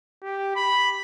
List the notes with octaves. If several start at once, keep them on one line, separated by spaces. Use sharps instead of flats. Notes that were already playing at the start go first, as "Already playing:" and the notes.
G4
B5